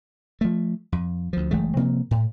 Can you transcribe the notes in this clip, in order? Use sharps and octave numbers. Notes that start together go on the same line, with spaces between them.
F3 A3
F2
D2 F3
F#1 E3 G#3 A3
C3 F3 A#3 C4
A2